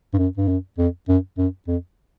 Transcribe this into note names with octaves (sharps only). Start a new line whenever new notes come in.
G2
F#2
G2
F#2
F2
F#2
F#2
F2